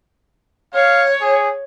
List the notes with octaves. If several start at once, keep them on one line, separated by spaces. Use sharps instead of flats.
C#5 F5
G#4